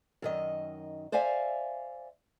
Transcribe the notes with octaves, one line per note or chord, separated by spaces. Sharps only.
F#2 D#3 D#5
C5 D5 E5 F5 G#5